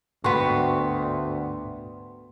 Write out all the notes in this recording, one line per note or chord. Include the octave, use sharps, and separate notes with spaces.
D2 G#2 B3 F#4 G5 C6 C#6 B6